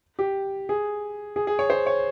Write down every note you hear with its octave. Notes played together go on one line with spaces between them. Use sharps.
G4
G#4
G#4
G#4
C#5
C5
C#5